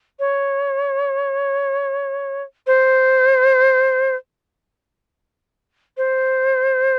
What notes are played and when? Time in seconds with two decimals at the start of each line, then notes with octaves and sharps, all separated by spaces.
0.19 C#5
2.66 C5
5.97 C5